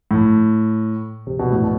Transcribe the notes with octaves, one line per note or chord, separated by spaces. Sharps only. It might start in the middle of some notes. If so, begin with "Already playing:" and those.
A2
C3
B2
A2
B2